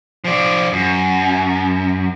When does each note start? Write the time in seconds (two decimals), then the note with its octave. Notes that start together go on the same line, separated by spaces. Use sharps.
0.24 F3 D5
0.73 F#2